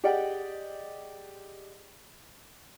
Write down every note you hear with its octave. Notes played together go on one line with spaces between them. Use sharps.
G4 G#4 D5 D#5 F#5 G5